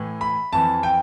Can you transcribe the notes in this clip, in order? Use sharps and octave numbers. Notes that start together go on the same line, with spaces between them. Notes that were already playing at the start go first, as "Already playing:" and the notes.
Already playing: A2 E3
B5
F2 E3 A5
G5